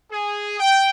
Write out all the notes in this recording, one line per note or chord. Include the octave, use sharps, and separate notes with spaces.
G#4
G5